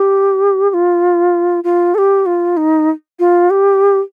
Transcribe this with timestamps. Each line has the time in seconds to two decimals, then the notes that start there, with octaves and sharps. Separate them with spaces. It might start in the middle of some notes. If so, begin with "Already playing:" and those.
Already playing: G4
0.70 G4
0.74 F4
1.64 F4
1.95 A4
1.98 G4
2.26 F4
2.57 D#4
3.19 F4
3.50 G4